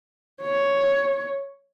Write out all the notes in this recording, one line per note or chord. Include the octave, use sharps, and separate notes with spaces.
C#5